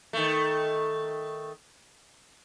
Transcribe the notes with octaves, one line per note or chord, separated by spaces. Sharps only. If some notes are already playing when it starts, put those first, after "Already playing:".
D#3 A3